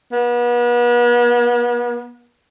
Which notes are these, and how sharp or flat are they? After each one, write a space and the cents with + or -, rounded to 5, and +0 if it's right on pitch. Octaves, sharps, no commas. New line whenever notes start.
B3 -40